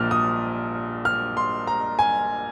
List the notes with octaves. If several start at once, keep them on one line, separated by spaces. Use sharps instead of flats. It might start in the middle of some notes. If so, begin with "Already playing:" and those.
Already playing: A#1 A#2 F3 F6
D#6
F6
C6
A#5
G#5